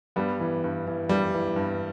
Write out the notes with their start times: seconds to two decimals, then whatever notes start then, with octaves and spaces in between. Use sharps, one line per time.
0.16 G2 G3 B3
0.40 E3
0.64 G2
0.87 E3
1.09 G2 G3
1.34 E3
1.56 G2